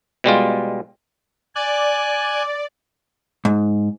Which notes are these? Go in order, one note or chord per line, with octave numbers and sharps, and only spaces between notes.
B2 G3 G#3 F4
D5 G#5 F#6
G#2